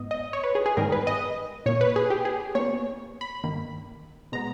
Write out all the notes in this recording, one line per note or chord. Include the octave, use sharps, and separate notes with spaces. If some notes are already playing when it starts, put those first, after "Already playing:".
Already playing: G#2 B3 D#5
D#5
C#5
B4
G#4
G#4
G#2 D#3 G3 B3 A#4
B4
D#5
A#2 A#3 C#5
B4
G#4
G4
G#4
B2 A#3 C#5
B5
G2 D#3 A#3
B2 G#3 B3 A#5